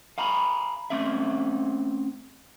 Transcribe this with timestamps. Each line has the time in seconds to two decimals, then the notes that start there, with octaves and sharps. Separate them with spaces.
0.18 F5 G#5 A#5 B5
0.90 A3 C4 C#4 E5